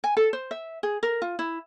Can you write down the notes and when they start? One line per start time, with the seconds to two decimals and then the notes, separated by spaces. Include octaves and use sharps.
0.04 G#5
0.17 A4
0.33 C5
0.51 E5
0.83 G#4
1.03 A#4
1.22 F4
1.39 E4